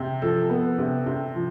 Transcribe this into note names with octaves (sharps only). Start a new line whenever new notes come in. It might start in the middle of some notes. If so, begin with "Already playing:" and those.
Already playing: C3
F3 A4
B3
C3
C3
F3